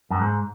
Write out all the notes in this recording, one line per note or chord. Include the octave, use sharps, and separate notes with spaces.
F#2
G#2